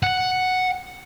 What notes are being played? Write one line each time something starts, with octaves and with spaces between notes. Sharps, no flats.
F#5